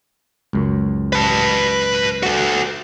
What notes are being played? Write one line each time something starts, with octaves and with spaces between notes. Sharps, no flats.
C#2 F#2
B4 A5
F#4 A4